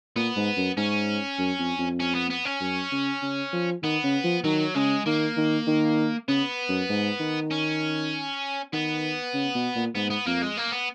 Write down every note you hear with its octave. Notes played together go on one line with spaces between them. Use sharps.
A#2 B3
G#2
F#2
G#2 C#4
F#2
F2
F2
C#4
B3
B3
C#4
F#2
C#3
C#3
F3
D#3 B3
C#3
F3
D#3 F#3
C#3 G#3
D#3 A#3
D#3
D#3
C#3 B3
F#2
G#2
D#3
C#4
D#3 B3
C#3
B2
A#2
G#2 B3
B3
F2 A#3
G#3
A#3
B3